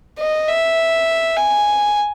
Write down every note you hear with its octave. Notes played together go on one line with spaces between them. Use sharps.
D#5
E5
G#5